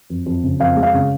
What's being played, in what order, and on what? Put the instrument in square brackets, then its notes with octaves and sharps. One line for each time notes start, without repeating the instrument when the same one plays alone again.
[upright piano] F2
F2
C#3
F2 F5
G#3
F5
C#3